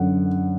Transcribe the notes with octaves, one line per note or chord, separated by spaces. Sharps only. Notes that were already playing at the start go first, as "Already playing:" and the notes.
Already playing: F#2 D3 F#5